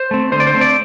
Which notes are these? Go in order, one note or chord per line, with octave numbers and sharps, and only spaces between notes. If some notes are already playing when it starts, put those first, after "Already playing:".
Already playing: C5
A3 C4
D3 C5
D5
C5
A3 C4
D5